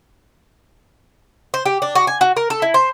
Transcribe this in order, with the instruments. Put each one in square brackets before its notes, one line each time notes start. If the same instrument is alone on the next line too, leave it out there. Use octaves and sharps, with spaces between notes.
[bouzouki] C5
G4
D4
F#4
G#5
F#4
A#4
A4
E4
C5